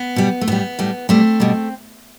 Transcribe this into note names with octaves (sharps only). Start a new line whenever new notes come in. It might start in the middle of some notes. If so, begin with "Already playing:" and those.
Already playing: B3
B2 G3
A3
A2 G3 B3
A2 G3
B2 G3 A3 C4
B2 G3